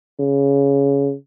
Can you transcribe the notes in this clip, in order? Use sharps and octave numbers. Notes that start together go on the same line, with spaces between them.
C#3